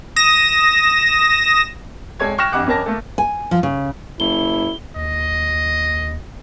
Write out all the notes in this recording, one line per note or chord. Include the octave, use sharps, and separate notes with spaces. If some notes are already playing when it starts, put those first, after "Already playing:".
D#6 A#6 E7
C2 G#3 A4 C#5 G#6
G5 C#6 F6 F#6 A#6 E7
G1 F2 G4 F#5 D6 F#6
F2 C#4 A#4 A5 A#6
A3 A#3 A4
G#5
F3
C#3
F#1 E4 G7
D#2 D#5